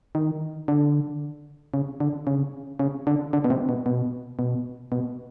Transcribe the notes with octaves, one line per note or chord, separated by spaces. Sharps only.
D#3
D3
C#3
D3
C#3
C#3
D3
D3
B2
C3
B2
B2
B2
B2